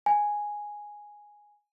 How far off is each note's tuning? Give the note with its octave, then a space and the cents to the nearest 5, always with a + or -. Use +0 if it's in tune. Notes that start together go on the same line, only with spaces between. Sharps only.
G#5 +0